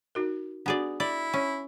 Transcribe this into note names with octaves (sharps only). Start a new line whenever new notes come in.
D#4 F#4 A#4
B3 D4 F#4 G#4 D5
E4 D5
C#4